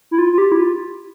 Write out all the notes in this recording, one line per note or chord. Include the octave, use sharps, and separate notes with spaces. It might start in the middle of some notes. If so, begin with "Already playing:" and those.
E4
F4
F4
G4
E4
F4